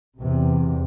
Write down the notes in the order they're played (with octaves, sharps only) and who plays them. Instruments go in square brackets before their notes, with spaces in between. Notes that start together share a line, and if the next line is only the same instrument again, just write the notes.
[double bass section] E2 C3